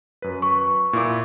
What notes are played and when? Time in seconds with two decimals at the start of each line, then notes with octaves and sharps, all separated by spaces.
0.22 F#2 B4
0.42 C#6
0.93 A#2 E4 D6